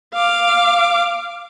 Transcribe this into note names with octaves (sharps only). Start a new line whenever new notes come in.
F5 D6